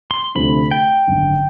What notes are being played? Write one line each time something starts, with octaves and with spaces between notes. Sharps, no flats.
C6
D2 C3 F3 A3 D4 B5
G5
G#1 F#2 D3